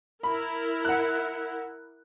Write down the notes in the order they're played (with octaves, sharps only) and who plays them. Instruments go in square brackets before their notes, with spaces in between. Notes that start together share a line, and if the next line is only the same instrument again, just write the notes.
[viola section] E4 A#4 [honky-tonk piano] B5
[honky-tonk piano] F#5 F#6